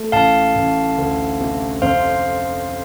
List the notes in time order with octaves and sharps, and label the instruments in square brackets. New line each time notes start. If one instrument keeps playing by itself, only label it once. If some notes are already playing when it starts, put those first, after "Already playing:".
Already playing: [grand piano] A3
[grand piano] A1 [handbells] F5 A5
[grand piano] A1
D2
C3
[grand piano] F2 [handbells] C5 F5